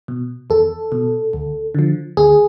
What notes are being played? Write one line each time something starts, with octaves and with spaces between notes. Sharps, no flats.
B2
E2 A4
B2
D2
D3 F3
D2 G#4